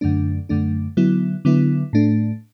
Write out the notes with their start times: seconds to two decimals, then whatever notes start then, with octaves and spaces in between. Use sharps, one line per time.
0.01 F#2 D3 A3 D4
0.49 F#2 D3 A3 D4
0.97 D3 F#3 B3 E4
1.45 D3 F#3 B3 E4
1.93 A2 A3 D4